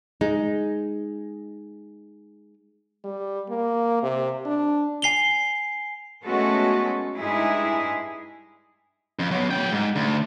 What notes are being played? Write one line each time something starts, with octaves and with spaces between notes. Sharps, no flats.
G#3 D#4
G3
A#3
C3
D4
G#5 C7 F7 G7
G#3 A3 B3 C#4 F#4 A4
G2 G#3 D#4 E4 G#4
F2
F#3 B3
F#3 G5
G#2
D2